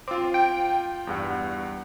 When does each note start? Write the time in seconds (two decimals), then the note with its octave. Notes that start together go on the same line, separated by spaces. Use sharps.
0.08 C4 F4 D6
0.34 G5
1.07 E2 G2 F#5